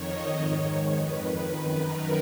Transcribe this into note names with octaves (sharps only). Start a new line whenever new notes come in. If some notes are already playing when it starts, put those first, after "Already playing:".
Already playing: F2 D#3 C#5
D#5
G#2 D#3 C#5
C#5
F2 D#3 B4
B4
F#2 D#3
A#4